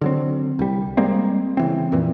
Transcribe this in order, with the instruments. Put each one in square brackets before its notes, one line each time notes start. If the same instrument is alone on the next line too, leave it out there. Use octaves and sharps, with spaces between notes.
[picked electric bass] D3 F#3 C4
C2 G3
G3 G#3 A#3 C4
C#3 E3 C4
F2 A#2 E3